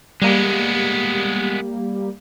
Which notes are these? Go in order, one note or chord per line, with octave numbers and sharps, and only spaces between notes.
G3 G#3 A#3 B3 G4